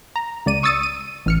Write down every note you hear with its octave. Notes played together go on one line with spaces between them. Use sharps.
A#5
C#2 D5 D#7
C#6 D#6 E6 A6 C#7 D#7
D#7
A1 F6 C#7